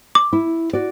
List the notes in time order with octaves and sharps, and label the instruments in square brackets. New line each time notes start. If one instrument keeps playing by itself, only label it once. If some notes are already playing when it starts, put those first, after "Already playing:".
[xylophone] D6
[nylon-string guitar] E4
F#4 D5